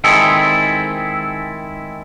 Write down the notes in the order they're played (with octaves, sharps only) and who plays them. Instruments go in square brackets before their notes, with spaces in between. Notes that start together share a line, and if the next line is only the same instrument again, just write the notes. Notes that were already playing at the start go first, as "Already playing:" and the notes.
[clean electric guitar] D#3 G#3 C4 E4 G#4 A4